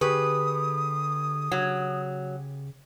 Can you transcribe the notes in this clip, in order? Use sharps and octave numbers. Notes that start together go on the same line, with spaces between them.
D3 G4 G#4 B4 C#6 D#6
C#3 F#3